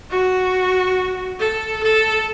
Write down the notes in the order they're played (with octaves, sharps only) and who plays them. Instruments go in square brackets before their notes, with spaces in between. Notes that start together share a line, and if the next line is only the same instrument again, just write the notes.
[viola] F#4
A4
A4